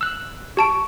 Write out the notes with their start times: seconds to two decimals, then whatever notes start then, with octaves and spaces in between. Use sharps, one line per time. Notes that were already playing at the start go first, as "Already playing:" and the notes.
0.01 E6 F#6
0.57 G4 A5 C#6 D7